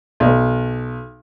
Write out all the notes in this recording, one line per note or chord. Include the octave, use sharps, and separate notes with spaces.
B1